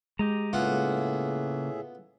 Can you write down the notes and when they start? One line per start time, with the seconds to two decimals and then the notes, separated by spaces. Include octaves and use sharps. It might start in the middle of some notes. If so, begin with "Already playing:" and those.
0.19 G#3 G4 D#5 A#5
0.53 A2 C#3 A#3 B3 F4 G#4 E5 F#5